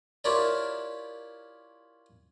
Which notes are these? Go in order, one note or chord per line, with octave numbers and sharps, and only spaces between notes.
E4 F4 G4 A#4 C#5 D5